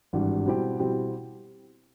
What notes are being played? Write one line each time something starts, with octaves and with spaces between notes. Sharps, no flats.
G#1 G2 E3 G3
B2 G3 C4 E4 G4
B2 G3 C4 E4 G4